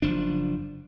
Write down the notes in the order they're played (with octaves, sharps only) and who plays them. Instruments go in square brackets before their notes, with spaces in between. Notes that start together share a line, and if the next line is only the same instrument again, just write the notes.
[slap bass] F#1 F3 D4